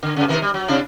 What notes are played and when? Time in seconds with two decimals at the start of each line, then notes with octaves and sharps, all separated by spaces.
0.03 D3
0.16 G2 C#3
0.28 C3 D#3 A#4
0.42 G3
0.54 F#3
0.68 C3 D4 E4